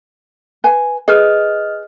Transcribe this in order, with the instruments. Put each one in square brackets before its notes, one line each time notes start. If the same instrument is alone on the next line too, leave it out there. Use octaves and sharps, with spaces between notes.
[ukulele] B4 G#5
[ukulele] G#4 B4 [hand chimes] D#5 F6